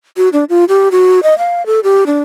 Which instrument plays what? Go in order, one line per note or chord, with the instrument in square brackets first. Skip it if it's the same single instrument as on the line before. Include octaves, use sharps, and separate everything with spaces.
[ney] F#4
D4
F4
G4
F#4
D#5
F5
A4
G4
D4